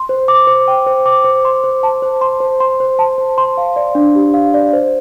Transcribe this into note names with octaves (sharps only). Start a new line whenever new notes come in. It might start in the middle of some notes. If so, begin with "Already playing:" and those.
Already playing: C6
C5
D6
C5
G5
C5
D6
C5
C6
C5
A5
C5
C6
C5
C6
C5
A5
C5
C6
F5
D5
D4
G4
F5
D5
C5